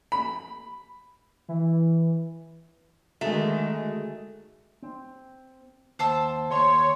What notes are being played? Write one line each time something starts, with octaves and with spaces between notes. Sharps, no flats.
B5
E3
D3 D#3 G#3 A3 F#4 G#4
C4
D#2 C5 A5 E6
D#2 A4 C#5 C6